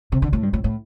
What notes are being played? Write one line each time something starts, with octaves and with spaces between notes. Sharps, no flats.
C3
D3
A2
G2
A2
A2